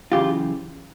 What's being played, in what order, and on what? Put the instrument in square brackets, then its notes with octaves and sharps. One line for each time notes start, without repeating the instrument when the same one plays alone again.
[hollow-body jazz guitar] F#2 C#3 E3 F4 G4